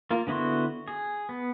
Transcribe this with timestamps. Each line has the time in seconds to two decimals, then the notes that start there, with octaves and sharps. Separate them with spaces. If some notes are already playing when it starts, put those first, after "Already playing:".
0.11 A#3 F4 A#4
0.27 D3 B3 E4 F#4 C6
0.88 G#4
1.29 B3